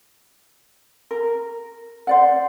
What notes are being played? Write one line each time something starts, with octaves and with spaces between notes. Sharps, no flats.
A#4
C5 D5 F#5